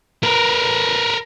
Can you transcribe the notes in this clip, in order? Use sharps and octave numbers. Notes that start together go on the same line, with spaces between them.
A#4 B4